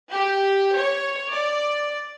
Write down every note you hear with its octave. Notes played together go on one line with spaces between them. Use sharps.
G4
C#5
D5